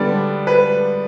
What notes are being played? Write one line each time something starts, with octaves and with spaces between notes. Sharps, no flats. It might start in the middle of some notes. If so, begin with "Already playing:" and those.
Already playing: D3 G3 B3 D4 D5
B4